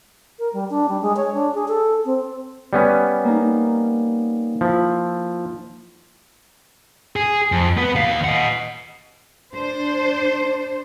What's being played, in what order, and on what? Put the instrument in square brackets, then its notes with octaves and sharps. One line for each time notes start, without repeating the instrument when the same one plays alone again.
[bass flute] A#4
G3
D4
G3
G#3
C#5
D4
G#4
A4
C4
[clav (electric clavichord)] G3 B3 C#4
[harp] A#3 D#4
[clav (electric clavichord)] F3 [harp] E4
[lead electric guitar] G#4
F2
B3 B4
D#2 F5
D#5 F#5
[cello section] D4 C5